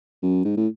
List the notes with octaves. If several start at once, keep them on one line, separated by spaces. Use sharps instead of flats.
F#2
G#2
A2